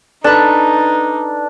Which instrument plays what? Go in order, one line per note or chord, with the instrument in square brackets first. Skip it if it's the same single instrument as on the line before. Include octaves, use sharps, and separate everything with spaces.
[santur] D4 [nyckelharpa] D#4 [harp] A4 B4